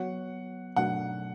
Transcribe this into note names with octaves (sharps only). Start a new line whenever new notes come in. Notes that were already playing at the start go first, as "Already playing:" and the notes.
Already playing: F#3 B3 F#4 C#5 F#5
B2 F#3 A3 D4 F#4 F#5